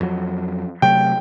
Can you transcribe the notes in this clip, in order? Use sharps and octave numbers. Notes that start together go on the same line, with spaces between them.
F2 F#3
C3 F#3 A3 G5